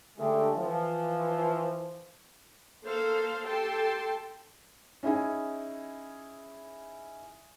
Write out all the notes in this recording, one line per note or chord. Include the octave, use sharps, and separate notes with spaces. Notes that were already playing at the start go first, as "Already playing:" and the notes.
D3 G#3 A3 G4
E3 F3
A#3 A4 C5 F5
G4 A4 G5 A5 C6
C#4 D#4 E4 G#4 G#5